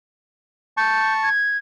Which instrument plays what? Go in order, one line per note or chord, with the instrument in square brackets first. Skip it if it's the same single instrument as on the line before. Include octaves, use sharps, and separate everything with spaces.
[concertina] A5 C#6 [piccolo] G6
[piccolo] G#6